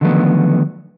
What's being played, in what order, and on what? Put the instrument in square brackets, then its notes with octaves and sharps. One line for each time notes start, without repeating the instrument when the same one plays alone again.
[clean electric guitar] D3 D#3 F3 F#3 A3 B3